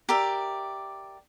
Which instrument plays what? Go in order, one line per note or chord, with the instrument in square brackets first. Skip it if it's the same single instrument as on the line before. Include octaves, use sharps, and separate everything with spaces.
[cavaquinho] G4 A#4 D5 E5